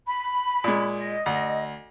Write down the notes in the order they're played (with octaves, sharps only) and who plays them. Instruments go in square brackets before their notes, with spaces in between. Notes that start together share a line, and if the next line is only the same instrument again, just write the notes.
[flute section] B5
[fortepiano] A#2 G#3
[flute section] D#5
[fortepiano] D2